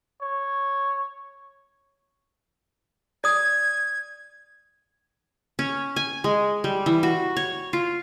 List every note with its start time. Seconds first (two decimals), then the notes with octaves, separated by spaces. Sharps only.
0.21 C#5
3.24 D5 D#6 G#6
5.59 C#4
5.96 G#5
6.24 G#3
6.64 G3
6.86 E3
7.03 F#4
7.37 C#5
7.73 F4